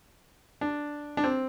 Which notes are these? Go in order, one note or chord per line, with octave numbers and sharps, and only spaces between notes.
D4
D4
C4